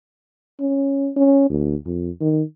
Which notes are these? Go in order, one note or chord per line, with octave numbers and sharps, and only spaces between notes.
C#4
C#4
D2
F2
D#3